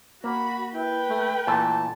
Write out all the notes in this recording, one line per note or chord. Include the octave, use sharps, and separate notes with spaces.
A#3 F#4 B5
E4 B4 G5
A3
A#2 E3 A3 A5